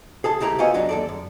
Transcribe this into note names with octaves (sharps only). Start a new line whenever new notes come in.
G#4 A4 A5
C#2 C3 A3 E4 G4 A#5
B3 C4 F4 F#4 D#5 G#5
F#2 F#3 D4 D#4
D#2 A4 D5
F#2